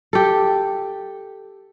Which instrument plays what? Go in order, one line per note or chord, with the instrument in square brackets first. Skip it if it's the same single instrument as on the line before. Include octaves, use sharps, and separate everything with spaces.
[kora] G4 A4